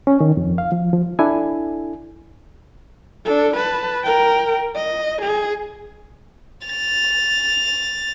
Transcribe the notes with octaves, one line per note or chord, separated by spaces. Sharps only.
C#4
D#3
F2
F5
F3
F3
D4 E4 A4 G#5
D4 A4
B4 A5
A#4 G5
D#5
G#4
A6 F7